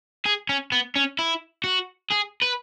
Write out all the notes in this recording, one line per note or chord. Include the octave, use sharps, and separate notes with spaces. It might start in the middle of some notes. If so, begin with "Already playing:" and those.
G#4
C#4
B3
C#4
E4
F#4
G#4
B4